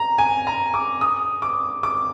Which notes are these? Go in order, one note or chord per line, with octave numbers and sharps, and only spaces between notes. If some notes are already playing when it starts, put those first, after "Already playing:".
Already playing: A#5
G#5
A#5
D6
D#6
D6
D6